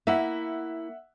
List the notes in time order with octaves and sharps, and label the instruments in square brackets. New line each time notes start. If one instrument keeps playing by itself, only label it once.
[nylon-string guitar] A#3 E4 [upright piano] E5 F#5